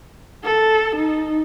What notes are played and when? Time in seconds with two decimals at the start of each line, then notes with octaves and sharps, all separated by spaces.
0.44 A4
0.96 D#4